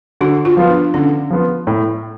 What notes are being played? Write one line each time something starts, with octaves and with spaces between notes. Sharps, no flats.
D3 F#4
F4
F3 B3 F4
D4
D3 C#4
F3 B3 F4
A2